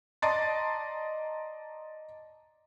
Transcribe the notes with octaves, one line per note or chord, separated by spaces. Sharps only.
D5 D#5 A5 A#5 C6 A6